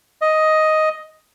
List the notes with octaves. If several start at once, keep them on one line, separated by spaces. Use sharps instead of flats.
D#5